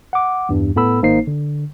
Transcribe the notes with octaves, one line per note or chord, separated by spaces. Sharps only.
F#5 D6
E2 G2 G3
A2 B3 A4 B5 E6
G#1 A#3 D#4 C5 C7
D3